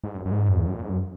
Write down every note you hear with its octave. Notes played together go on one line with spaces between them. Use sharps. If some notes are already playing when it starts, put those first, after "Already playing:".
G#2
F#2
F#2
G#2
F#2
E2
F#2
A#2
G#2
F#2